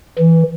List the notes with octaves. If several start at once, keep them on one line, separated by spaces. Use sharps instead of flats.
E3